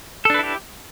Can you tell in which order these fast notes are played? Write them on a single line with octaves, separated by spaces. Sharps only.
A4 D4 B4 E4 G4